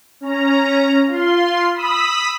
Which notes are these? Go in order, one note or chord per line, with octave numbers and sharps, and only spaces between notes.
C#4 A#5
F4 C6
B5 D#6 E6 B6